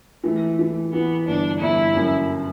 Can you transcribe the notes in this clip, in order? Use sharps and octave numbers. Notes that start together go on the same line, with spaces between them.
E3 A3
E3
E3 B3
G1 D4
G1 E4
F#2